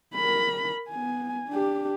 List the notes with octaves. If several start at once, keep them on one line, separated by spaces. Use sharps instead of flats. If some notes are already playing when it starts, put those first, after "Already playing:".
A#4 B5
B3 G#5
D4 G4